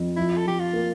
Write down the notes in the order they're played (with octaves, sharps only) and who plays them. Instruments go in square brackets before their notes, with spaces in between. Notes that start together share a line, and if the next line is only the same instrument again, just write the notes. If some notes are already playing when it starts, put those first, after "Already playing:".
Already playing: [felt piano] F2
[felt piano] F3 [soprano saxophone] E4
[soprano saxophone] A4
[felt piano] F3 [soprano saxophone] G4
[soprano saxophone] F4
[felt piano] A#3